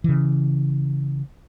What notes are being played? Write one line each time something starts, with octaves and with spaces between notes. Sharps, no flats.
C#3 E3